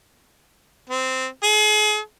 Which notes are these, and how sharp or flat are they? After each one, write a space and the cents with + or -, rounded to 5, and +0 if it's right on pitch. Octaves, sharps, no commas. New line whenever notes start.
C4 -10
G#4 +35